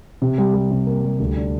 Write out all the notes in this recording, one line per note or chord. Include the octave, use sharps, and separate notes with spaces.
C3
G3
G3
C3
A#3
G3
D2
D4